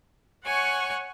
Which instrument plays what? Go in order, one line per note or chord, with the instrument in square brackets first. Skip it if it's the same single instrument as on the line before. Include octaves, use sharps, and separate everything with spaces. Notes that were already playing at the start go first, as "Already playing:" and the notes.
[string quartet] C#5 F#5 G#5 C#6